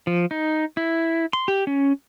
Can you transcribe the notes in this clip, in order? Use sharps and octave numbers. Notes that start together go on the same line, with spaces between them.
F3
D#4
E4
C6
G4
C#4